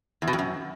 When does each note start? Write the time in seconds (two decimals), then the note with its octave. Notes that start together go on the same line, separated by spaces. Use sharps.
0.22 E2
0.28 B2
0.33 F2
0.39 F#2